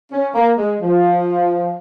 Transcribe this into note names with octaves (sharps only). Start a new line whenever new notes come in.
C#4
A#3
G#3
F3